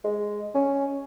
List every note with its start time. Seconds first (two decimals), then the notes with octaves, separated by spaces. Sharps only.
0.04 G#3
0.55 C#4